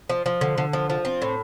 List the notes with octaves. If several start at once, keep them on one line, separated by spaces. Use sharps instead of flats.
F3
F3
D3
D3
F3
F3
C4
A2